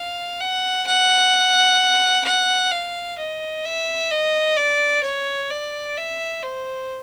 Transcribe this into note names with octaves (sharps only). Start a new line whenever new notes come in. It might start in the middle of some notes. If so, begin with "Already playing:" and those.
Already playing: F5
F#5
F#5
F#5
F5
D#5
E5
D#5
D5
C#5
D5
E5
C5